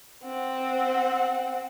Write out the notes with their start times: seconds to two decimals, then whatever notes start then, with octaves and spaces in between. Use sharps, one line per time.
0.24 C4 F#5